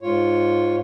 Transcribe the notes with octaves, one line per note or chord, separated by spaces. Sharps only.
G#2 F4 C#5